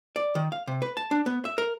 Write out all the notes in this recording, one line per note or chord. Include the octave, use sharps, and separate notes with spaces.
D5
D#3
F5
C3
B4
A5
D4
B3
E5
A#4